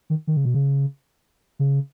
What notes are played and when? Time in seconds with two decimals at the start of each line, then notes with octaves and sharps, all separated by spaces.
0.10 D#3
0.27 D#3
0.37 C#3
0.45 B2
0.54 C#3
1.59 C#3